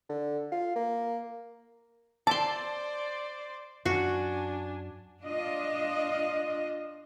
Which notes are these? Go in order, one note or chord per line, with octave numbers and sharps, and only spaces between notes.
D3
F4
A#3
C5 D5 A5 C6 D6
F#2 D4 F#4 G#5
D4 F4 D#5